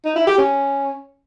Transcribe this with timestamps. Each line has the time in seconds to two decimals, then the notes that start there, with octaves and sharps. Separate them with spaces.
0.05 D#4
0.16 E4
0.27 G4
0.38 C#4